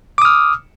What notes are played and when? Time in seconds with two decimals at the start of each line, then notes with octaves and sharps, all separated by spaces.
0.18 D6
0.22 D#6
0.25 F6